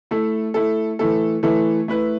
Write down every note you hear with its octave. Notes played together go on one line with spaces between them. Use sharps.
A3 E4 A4
A3 E4 A4
E3 A3 E4 A4
E3 A3 E4 A4
A3 E4 B4